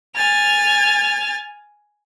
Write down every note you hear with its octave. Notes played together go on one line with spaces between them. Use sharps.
G#5 F6 A6